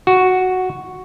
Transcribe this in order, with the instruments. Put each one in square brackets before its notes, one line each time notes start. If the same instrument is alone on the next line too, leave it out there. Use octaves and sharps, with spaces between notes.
[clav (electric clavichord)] F#4